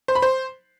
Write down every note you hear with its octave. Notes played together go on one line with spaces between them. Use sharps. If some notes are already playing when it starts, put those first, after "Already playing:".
C5
B5
C5